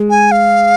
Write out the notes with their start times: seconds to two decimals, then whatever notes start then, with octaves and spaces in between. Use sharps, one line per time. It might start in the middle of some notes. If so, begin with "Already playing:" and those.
Already playing: G#3
0.10 G#5
0.32 F5